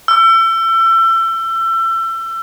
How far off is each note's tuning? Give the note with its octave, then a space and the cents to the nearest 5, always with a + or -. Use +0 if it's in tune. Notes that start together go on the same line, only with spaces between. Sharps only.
E6 +30